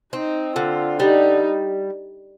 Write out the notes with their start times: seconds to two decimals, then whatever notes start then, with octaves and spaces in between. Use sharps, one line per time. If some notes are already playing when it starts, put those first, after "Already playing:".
0.13 C4 D#4
0.56 D3 F4
1.00 G3 D#4